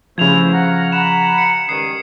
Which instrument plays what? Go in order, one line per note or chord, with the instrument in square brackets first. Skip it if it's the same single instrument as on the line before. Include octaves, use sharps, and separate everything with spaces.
[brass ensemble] G2 [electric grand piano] C#3 F3 [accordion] A3 E4 C5 [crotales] G#6 F7
[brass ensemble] F5 [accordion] F#5 A#5 F6
[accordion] F#5 B5 [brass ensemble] A#5 [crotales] E7
[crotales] C#7
[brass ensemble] G2 G#3 C#4 [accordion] D#3 D#6 [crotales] C7